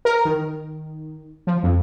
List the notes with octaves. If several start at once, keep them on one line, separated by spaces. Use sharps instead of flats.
A#4
D#3
F3
F2